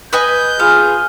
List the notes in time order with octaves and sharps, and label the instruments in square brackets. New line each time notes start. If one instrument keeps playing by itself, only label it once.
[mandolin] B4 D#5 G#5 [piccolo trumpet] G6
[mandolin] B3 [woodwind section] F4 F6 [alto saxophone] G#4